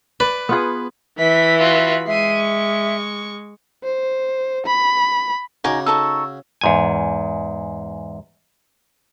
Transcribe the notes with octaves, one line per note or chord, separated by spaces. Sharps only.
B4 D5
B3 F4 G#4
E3 E5 B5 B6
F4 F#4
G#3 E5 C7 D#7
C#6
C5
B5
C#3 D#4 F#4 G#5 D6
D#4 A4 C#6 E6
E2 G#2 G#5